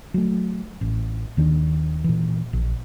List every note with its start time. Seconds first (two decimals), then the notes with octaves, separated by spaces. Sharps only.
0.14 F#3 A3
0.81 A1
1.37 D#2 D#3 D4
2.04 A#2 E3
2.53 A#1